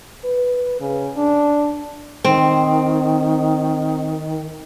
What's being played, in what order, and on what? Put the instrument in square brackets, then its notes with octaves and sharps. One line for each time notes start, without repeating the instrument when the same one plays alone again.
[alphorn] B4
C#3
D4
[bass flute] D#3 [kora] C4